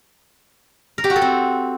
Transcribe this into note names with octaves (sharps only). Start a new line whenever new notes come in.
A#4
G4
F#4
A4
C4